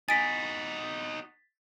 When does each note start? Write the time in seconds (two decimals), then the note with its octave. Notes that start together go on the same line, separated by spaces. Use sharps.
0.09 D#4 F#4 G#5 A6 B6 D7